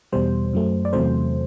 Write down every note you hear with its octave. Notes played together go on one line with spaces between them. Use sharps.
E2 B2 G3 C5
F#2 F#3 A3
D5
E2 C3 F#3 A3 C5